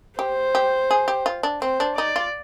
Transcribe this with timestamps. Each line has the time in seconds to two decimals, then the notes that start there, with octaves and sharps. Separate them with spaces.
0.19 G4 C5
0.55 G4
0.91 G#4
1.08 G4
1.26 F4
1.43 D4
1.62 C4 C5
1.80 D4
1.97 D#4 D5
2.16 F4